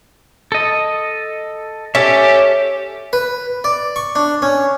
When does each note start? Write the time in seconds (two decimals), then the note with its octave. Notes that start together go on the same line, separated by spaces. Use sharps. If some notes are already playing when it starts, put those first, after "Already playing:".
0.52 A4 D#5
1.95 C#4 G4 A4 E5
3.13 B4
3.64 D5
3.96 C#6
4.16 D4
4.42 C#4